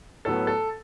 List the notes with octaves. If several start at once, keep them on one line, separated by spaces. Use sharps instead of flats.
A2 F#3 B3 A4
A4